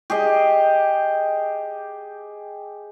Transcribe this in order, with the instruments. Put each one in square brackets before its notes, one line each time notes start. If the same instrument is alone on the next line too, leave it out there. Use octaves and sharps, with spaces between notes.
[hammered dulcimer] G4 G#4 D#5